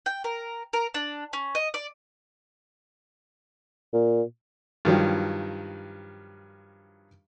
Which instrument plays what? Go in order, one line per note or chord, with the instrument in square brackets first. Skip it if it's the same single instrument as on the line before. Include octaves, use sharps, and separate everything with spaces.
[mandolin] G5
A#4
A#4
D4
C#4
D#5
D5
[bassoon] A#2
[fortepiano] G2 D#3 F3 F#3